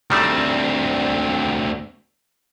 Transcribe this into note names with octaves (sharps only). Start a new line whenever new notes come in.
D2 D#3 G3 A3 C4